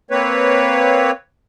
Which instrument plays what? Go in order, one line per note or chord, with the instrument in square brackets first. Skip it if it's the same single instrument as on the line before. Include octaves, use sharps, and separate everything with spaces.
[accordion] A#3 C4 B4 C#5